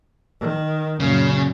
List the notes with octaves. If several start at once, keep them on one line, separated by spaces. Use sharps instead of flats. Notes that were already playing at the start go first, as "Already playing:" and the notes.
D#3
F#2 A#2 C#3